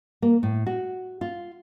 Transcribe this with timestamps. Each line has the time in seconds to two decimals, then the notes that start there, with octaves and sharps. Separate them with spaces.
0.22 A#3
0.43 A2
0.67 F#4
1.21 F4